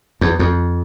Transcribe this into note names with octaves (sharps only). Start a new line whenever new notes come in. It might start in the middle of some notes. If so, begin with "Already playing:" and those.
E2
F2